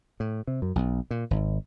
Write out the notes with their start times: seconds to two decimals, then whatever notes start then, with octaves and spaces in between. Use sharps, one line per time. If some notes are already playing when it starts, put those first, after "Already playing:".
0.20 A2
0.47 C3
0.62 F#2
0.75 B1
1.11 A#2
1.31 G#1